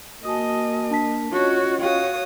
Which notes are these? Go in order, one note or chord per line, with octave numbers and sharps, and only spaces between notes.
A#3 F#4 D#5 G#5 A5 D#6
D4 A5 B6
C#4 F4 F#4 C#5 D#5
F#4 C#5 F5 G5 D#6